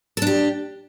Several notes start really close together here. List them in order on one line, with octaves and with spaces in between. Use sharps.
A4 D4 G4